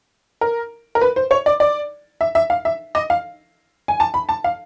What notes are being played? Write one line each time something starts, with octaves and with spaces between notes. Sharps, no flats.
A#4
A#4
B4
C5
C#5
D5
D5
E5
E5
F5
E5
D#5
F5
G#5
A5
B5
A5
F5